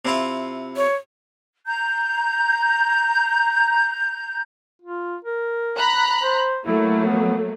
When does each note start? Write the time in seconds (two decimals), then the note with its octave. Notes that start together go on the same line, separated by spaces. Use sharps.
0.05 C3 E4 F4
0.77 C#5
1.67 A#5 G6
4.82 F4
5.25 A#4
5.77 A#5 B5 F#6
6.21 C5
6.66 F#3 A3 A#3 E4
7.05 B3